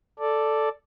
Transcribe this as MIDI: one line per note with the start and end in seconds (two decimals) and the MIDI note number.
0.19 0.69 69
0.19 0.69 74